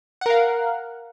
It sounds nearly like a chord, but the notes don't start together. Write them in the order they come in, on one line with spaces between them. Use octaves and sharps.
F#5 A#4 F5